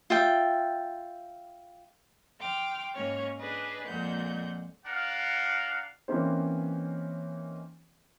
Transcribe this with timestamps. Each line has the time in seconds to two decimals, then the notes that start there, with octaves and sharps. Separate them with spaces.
0.10 F4 E5 G5
2.39 G5 C6 D6 F6
2.94 G#2 A#3 C#4 C#5 F6
3.39 D4 G#4 B4 D#5
3.87 F2 A#2 G#3 F#5 G6
4.86 D4 A#4 F5 F#5
6.08 E3 A#3 C4 C#4 D#4 C5